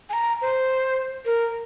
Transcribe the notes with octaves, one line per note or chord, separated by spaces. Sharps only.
G#5
A#5
C5
A#4